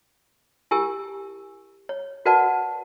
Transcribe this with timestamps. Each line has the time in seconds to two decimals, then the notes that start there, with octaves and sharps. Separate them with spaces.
0.71 E4 G4 A#4 G#5 E6
1.89 C#5
2.25 F#4 A#4 B4 D5 F#5 A5